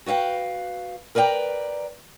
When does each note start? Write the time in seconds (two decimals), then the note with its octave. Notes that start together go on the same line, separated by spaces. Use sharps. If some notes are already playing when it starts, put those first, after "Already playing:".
0.06 F#4 B4 E5 F5 G5
1.15 A#4 B4 D5 E5 G5 A#5